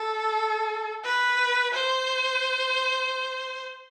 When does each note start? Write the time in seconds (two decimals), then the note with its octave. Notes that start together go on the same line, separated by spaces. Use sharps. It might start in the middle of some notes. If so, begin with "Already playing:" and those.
Already playing: A4
1.05 B4
1.74 C5